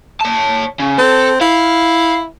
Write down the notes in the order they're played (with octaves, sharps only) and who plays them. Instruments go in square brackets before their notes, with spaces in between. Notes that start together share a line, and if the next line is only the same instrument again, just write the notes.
[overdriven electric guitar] C#5 A5
C#3
[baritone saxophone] C4 [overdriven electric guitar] A4
[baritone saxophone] E4 [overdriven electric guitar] F5